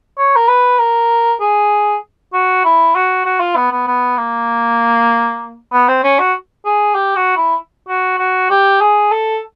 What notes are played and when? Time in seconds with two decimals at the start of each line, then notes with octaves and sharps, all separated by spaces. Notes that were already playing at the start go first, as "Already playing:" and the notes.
0.18 C#5
0.36 A#4
0.48 B4
0.79 A#4
1.40 G#4
2.33 F#4
2.64 E4
2.95 F#4
3.25 F#4
3.40 F4
3.56 B3
3.72 B3
3.87 B3
4.17 A#3
5.72 B3
5.88 C4
6.03 C#4
6.19 F#4
6.65 G#4
6.95 G4
7.16 F#4
7.37 E4
7.88 F#4
8.18 F#4
8.50 G4
8.81 G#4
9.11 A4